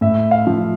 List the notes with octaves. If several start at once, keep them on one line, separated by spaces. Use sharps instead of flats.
A2 E5
F5
F3